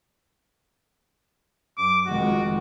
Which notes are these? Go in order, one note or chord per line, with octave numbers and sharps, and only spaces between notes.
F#2 D6
F1 D#3 G#3 F#4